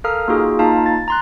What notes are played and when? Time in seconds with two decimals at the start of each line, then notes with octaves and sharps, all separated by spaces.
0.04 A4 A#4 F5 A#5 D#6 F6
0.28 A#3 D#4 F4 F#4 G#4
0.59 A#3 D#4 F4 F5 A5 A#5
0.86 A6
1.08 A#5 C6 F#6